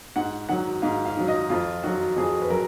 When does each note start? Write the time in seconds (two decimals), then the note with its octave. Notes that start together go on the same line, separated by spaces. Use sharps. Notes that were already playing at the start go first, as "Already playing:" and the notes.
0.16 G#2 F#5
0.49 D#3 F#3 F#5
0.82 G#2 F5
1.05 F5
1.17 D#3 F#3
1.28 D#5
1.49 F2 F4
1.83 D#3 F#3 F#4
2.17 F2 G#4
2.42 B4
2.50 F#3 A#4